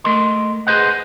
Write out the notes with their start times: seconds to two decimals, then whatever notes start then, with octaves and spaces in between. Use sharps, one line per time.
0.04 A3 A#4 D#5 C6
0.67 G#4 B4 C5 D#5 F#5